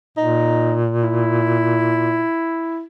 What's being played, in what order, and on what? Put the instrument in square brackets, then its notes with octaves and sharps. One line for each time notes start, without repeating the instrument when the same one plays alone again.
[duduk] A#2 [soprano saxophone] D#4
[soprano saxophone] E4